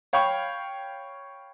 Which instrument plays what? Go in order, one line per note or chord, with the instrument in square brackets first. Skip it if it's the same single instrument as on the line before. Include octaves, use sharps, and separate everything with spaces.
[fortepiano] C#5 F5 G5 B5 C#6